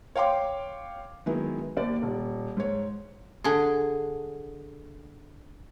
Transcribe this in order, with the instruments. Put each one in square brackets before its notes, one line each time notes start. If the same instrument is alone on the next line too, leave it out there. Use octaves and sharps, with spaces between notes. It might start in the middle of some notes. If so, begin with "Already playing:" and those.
[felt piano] C#5 F5 G5 C6 D6
D#3 F#3 G#3 B3 E4
D#2 D5
D#1
G#2 C#5
[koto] D3 G#4